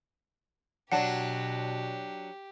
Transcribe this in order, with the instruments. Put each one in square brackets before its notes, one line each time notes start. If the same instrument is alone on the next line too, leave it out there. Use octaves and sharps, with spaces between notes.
[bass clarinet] B2 [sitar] F#3 D4 [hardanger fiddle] G4 [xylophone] F#5